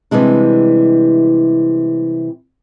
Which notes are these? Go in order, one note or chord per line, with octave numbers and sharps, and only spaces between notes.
C3 E3 G3 G#3 D4